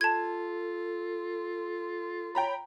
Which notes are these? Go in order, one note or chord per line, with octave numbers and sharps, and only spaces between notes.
F4 A4 A5 G#6
C#5 G5 A#5 B5